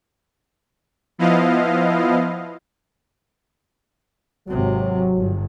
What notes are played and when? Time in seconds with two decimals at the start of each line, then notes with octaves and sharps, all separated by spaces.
1.18 F3 B3 E4 D#5 F5
4.48 G#1 C3 F#3
5.16 G1